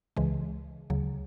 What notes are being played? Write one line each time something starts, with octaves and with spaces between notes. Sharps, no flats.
C#2 C#3 E3 G#3
D2 C#3 F#3